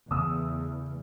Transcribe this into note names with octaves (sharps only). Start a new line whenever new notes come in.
E2 C#3 A3 D#6 E6